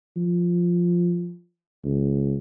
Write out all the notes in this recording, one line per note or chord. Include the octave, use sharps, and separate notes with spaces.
F3
C#2